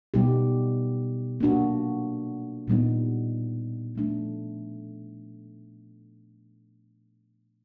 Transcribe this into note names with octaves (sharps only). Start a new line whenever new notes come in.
B2 G3 B3 D#4 G4
A#3 D4 F#4
A#2 G3 B3 D#4
F3 A3 D4